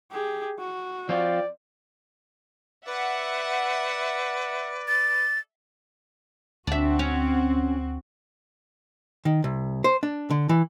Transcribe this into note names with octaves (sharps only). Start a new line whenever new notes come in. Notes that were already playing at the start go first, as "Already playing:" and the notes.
G4 G#4
F#4
F3 C4 F4 D5
B4 D5 E5 F#5
A6
D2 C4 D4 F#4 E5
C#4
D#3
C2
C5
D4
D3
E3